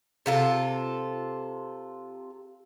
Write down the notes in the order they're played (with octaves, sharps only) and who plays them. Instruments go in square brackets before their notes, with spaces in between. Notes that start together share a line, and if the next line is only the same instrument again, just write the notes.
[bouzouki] C3 F4 A4